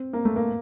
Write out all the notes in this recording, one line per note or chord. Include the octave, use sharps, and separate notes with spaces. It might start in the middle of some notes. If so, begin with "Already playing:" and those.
Already playing: C4
A#3
A3
A#3